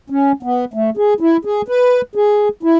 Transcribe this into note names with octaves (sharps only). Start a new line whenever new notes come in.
C#4
B3
A3
G#4
E4
G#4
B4
G#4
E4